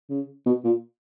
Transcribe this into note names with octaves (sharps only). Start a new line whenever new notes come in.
C#3
B2
A#2